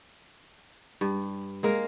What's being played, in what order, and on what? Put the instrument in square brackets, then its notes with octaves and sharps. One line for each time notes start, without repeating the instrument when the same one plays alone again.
[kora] G2
G#3 A#3 A#4